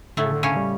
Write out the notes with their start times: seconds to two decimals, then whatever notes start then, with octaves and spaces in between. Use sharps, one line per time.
0.17 A2 D3 A3
0.25 C#3
0.32 D3
0.43 C#3 C#4
0.56 G3